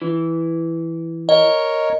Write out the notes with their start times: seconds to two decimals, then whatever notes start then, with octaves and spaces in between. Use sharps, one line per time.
0.02 E3
1.29 A#4 C#5 D#5